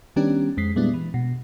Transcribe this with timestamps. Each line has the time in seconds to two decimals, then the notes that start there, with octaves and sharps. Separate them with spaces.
0.16 D#3 G3 B3 C#4 D4 G4
0.57 F2 G#3 B6 C7
0.76 A#2 G3 G#3 B3 D4 E4
0.94 E3
1.14 B2